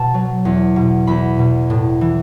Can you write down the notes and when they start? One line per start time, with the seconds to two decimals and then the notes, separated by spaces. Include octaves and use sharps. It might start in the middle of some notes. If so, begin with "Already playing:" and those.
Already playing: B2 A5
0.14 F#3
0.45 E2
0.76 B2
1.07 E2 B5
1.39 B2
1.70 A2
2.01 E3